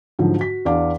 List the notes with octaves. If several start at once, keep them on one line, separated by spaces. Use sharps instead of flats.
G#2 D3 F3 F#3
F#4 B6
E2 D4 D5 F5 D6